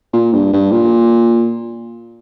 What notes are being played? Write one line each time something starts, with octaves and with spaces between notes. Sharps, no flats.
A#2
G2
G2
A#2